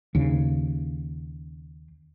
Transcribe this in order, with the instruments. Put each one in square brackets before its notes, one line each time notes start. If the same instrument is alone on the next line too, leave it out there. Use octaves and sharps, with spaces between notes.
[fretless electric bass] D#2 C#3